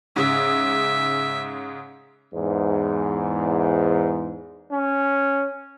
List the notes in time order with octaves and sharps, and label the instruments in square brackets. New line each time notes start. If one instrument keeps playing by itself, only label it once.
[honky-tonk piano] G#2 C#3 [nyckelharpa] E5
[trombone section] E2 G#2
[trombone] C#4